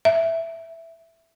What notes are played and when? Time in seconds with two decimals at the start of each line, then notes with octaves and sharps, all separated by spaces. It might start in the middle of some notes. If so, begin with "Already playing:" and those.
0.05 E5